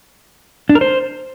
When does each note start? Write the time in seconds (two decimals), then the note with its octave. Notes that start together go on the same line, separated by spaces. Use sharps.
0.69 D4
0.75 A#4
0.81 C5